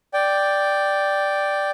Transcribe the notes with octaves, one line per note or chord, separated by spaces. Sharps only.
D5 G5